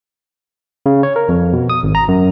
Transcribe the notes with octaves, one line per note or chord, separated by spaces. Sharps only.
C#3
C#5
A#4
F2
B2
D#6
G#1
A#5
F#2